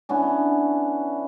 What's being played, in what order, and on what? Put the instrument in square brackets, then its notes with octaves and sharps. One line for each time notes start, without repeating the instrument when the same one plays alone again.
[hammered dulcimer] E3 B3 C#4 D4